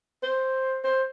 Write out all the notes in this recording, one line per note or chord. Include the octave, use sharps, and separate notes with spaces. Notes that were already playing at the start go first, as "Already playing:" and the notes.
C5
C5